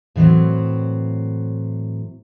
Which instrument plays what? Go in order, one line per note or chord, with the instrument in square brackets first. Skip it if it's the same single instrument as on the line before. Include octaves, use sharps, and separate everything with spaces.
[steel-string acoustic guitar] A2 E3 F#3 C4